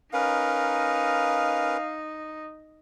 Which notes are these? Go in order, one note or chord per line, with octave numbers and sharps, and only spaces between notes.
C#4 D#4 A#4 B4 F5